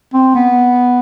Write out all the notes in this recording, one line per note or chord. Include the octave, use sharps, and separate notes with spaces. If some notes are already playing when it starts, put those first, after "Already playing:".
C4
B3